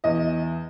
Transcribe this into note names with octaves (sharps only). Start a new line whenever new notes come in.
E2 D#5